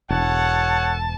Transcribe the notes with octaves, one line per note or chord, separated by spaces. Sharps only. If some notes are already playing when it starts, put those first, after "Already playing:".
E1 A4 C#5 F#5 A5